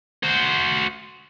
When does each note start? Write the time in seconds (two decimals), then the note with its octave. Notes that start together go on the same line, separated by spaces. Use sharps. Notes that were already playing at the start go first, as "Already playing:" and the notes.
0.23 F#4 C5